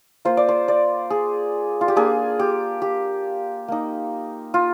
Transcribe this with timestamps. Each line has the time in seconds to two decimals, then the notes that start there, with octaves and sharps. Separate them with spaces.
0.25 A#3 F4 C5
0.37 D5
0.49 C5
0.68 D5
1.10 G#4
1.81 F4
1.88 G4
1.96 A#3 D4 F4 G#4
2.39 G4
2.82 G4
3.68 A#3 D#4
4.54 F4